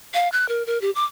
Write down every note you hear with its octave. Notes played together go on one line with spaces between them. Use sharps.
F5
F#6
A#4
A#4
G4
D6